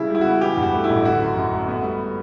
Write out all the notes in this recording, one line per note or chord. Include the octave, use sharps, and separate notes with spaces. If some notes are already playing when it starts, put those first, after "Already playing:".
Already playing: C#3 G3 E4
G3 E4
F#4
B3
E3 G4
G2
F#4
A3
E4
A1
D3 F#4
F#2
F#2
A3
B3
G3